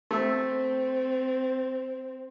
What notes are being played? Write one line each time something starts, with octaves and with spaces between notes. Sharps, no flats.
A3 C4 E5